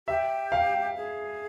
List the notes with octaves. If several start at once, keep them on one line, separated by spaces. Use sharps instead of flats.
G4 E5
F5
G#4